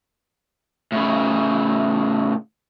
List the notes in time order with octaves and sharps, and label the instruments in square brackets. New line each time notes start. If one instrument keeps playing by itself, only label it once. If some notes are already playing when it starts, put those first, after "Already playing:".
[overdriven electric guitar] A2 C#3